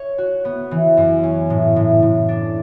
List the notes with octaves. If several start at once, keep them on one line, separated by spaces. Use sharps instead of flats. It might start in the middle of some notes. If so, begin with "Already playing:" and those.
Already playing: C#5
F#4
B3
E3
F#2
C#4
A2
A2
A2
D4